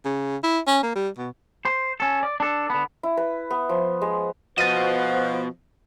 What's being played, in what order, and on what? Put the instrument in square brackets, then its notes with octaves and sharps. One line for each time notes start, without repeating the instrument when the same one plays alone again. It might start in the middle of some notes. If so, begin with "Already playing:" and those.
[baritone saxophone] C#3
E4
C#4
A#3
G3
B2
[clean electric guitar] C5
C#4 A4
D5
D4 A4
D3 B3
[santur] E4
B4
B3
F3
G#3
[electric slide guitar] B2 D#5 [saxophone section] F3 [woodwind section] F#4 B4 C5 [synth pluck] A6 D#7